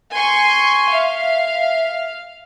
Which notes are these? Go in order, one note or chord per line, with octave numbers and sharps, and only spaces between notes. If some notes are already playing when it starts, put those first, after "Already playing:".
G#5 C6 C#6
E5 F5